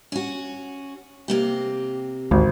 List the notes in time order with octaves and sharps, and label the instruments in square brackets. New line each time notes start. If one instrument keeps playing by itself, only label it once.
[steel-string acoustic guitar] C#4 F#4
C3 A#3 G4
[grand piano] G#1 [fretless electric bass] D2